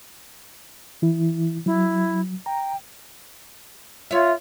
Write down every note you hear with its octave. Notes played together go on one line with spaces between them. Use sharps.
E3 E4
F#3 E4
G5 A#5
F4 C#5 E5